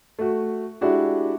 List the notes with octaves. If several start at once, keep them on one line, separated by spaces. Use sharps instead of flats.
A3 F#4
G#3 D4 E4 F#4 G4